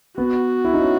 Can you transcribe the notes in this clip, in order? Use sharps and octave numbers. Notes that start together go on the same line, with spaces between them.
B3 F#4
E4
D#4
C#4